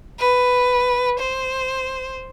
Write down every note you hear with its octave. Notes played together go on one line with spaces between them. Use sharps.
B4
C5